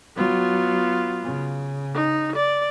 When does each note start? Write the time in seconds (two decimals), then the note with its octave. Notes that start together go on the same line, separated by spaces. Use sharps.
0.17 F#3 B3 F4
1.23 C#3
1.94 D#4
2.36 D5